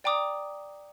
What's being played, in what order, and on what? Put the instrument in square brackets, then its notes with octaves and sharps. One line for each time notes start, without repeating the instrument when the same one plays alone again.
[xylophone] D5 G5 A#5 D6 D#6